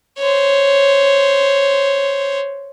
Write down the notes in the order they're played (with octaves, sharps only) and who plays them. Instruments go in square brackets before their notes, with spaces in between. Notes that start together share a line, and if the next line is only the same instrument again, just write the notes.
[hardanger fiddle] C5 C#5